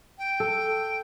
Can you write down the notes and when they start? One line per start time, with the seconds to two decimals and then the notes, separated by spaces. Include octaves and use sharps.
0.18 G5
0.40 A4